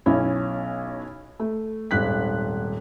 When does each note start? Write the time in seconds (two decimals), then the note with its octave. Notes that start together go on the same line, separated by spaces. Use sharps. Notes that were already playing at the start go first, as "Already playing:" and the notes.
0.06 B1 C#4 E4
1.40 A3
1.91 D#1 G#1 F#6 B6